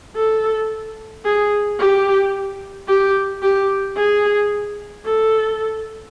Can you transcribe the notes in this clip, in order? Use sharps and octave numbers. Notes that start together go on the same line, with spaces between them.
A4
G#4
G4
G4
G4
G#4
A4